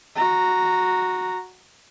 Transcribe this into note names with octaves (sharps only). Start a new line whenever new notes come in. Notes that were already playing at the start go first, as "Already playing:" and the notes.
F#4 A#5